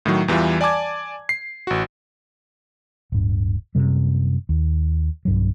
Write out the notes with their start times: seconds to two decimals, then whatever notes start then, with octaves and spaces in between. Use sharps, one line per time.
0.06 A2 D#3 F#3
0.28 E2 E3 G3 F4 E5
0.61 D5 G#5 A5 D6 G#6
1.29 C7
1.67 A1 F#4
3.12 D1 G2
3.75 F#2 C3 G3
4.49 D#2
5.25 B1 G2 F#3